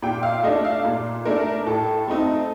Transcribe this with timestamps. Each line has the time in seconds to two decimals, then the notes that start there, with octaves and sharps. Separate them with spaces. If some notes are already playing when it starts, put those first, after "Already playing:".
0.02 A#2 G5
0.23 F5
0.43 A3 D4 D#5
0.65 F5
0.85 A#2
1.25 A3 D4 A#4
1.67 A2 A4
2.07 A3 C4 D#4